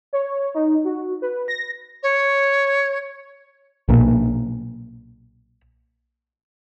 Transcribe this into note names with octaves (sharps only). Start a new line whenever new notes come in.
C#5
D#4
F#4
B4
A#6
C#5
B1 A#2